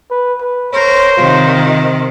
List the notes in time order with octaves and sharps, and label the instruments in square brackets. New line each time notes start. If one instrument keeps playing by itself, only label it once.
[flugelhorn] B4
B4
[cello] A#4 [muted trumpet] C5 [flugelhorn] C#5
[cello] C3 D#3 [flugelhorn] F4
[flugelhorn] D#5